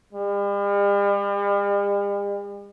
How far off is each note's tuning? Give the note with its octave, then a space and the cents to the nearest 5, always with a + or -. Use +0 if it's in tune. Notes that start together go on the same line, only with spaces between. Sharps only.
G3 +45